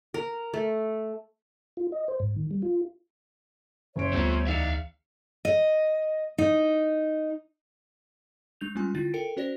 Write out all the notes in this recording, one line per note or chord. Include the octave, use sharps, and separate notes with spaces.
A#4
A3
F4
D#5
C5
G#2
D#3
G3
F4
F#1 C#4 C5 C#5 E5 D7
D2 G3 B3 C4 F4
E2 D#4 E4 D5 E5 F5 C#7
D#5
D#4
G#3 D4 G6 F7
G3 G#3 C#4 F4 G#5
D3 D4 E4 F4 A6
A4 A#4 G5 C#7 D7
C#4 F#4 C5 D5 A#6